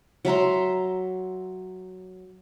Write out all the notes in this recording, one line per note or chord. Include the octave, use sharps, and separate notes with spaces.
F#3 E5 A#5 C6